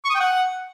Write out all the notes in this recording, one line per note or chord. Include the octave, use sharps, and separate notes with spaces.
C#6
D#6
G5
F#5